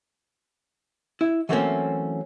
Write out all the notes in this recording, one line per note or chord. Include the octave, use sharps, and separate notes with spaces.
E4
E3 F#3 A3 A#3 C4 C#4